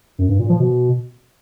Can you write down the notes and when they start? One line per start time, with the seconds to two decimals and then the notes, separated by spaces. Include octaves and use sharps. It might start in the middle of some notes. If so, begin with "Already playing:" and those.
0.19 F#2
0.29 G2
0.39 A#2
0.49 F3
0.60 B2